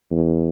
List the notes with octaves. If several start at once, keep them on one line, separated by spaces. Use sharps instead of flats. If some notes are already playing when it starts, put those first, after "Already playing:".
E2